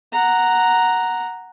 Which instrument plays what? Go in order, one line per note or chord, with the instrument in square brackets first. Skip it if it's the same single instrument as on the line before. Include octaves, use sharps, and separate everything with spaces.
[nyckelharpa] F#5 A#5